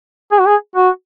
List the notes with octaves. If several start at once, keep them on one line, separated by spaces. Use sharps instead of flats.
G#4
F#4
G#4
F#4